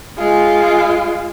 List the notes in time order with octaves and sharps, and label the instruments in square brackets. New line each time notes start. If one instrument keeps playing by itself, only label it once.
[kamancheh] G#3 F4